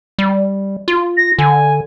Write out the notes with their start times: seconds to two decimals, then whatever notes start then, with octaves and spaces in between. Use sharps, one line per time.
0.19 G3
0.88 F4
1.17 A#6
1.39 D3 G#5